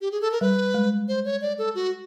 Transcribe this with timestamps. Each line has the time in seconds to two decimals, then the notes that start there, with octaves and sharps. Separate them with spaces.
0.01 G4
0.12 G#4
0.21 A4
0.32 A#4
0.41 G3 B4
0.74 G#3
1.08 C5
1.25 C#5
1.41 D5
1.58 A4
1.75 F#4